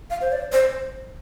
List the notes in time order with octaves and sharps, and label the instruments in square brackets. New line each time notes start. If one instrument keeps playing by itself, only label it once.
[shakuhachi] F5
C5
D5
C5